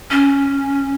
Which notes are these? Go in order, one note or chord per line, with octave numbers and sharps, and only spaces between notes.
C#4